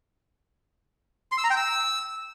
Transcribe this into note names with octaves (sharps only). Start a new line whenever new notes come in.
C6
E6
A#5
G5
E6